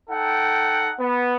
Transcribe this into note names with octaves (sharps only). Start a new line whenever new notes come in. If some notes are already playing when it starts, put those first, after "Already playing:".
D#4 A4 F#5 G5
B3